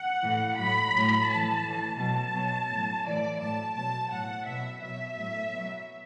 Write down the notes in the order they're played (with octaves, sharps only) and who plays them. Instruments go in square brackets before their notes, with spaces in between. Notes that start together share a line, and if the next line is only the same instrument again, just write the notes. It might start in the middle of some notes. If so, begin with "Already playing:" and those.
Already playing: [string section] F#5
A2 E3
A2 F#3 B5
A2 F#3
A2 E3 A5
A2 E3
B2 F#3 A5
B2 F#3
A2 F#3
A2 E3 D5
A2 F#3 A5
B2 F#3 A5
A2 F#3 F#5
B2 F#3 E5
B2 F#3 E5
A2 F#3
B2 F#3